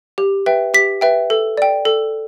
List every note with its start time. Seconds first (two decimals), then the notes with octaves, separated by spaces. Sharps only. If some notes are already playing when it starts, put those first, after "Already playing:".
0.18 G4
0.46 B4 E5 G5
0.74 G4 B6
1.01 B4 E5 G5
1.30 A4
1.57 D5 G5
1.85 A4